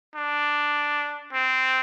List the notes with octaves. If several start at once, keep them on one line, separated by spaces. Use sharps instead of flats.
D4
C4